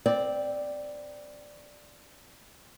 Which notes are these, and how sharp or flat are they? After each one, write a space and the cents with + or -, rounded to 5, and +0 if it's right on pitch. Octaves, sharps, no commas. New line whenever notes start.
C4 -5 D5 +0